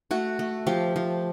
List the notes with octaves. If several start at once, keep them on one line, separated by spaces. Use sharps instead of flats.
A3 F#4
A3
F3 G4
F3